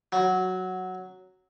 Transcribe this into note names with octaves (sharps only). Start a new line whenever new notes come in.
F#3